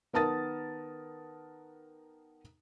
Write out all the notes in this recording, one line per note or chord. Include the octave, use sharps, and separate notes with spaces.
D#3 B3 A#4 A5 D#6 A6